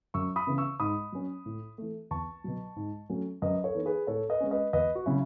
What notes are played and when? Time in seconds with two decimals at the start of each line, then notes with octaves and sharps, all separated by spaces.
0.14 F#2 C#6 E6
0.36 B5 D#6
0.47 C#3 E3 B3 E4
0.58 C#6 E6
0.80 G#2 B5 D#6
1.12 F#3 C#4
1.46 A2
1.78 E3 A3
2.11 E2 A5 C#6
2.44 B2 F#3
2.76 G#2
3.10 F#3 A3 C#4
3.42 F#2 B4 D#5
3.64 A4 C#5
3.75 E3 B3 D#4
3.86 G#4 B4
4.07 A2 A4 C#5
4.29 B4 D#5
4.40 G#3 C#4
4.51 B4 D#5
4.73 E2 B4 D#5
4.95 F#4
5.06 C#3 F#3 C#4 E4